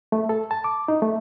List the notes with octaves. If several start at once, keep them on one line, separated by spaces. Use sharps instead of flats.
A3
A4
A5
D6
D#4
A3